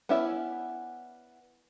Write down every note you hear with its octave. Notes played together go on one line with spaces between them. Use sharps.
B3 C#4 E4 D5 E5